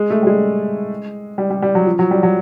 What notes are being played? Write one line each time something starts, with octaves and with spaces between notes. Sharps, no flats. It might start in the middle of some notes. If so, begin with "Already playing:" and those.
Already playing: G#3
A3
G3
G#3
G3
G3
G3
F#3
F3
F#3
G3
F#3